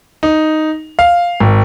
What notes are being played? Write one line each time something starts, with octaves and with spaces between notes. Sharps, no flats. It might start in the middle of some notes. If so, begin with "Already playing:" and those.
D#4
F5
G#1